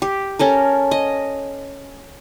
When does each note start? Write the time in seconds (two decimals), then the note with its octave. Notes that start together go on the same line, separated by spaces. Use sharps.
0.02 G4
0.39 C#4 A4 A#4
0.91 D#5